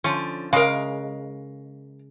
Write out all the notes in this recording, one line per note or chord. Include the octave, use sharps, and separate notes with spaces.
D3 F3 C#4
C#3 G#3 A#4 F5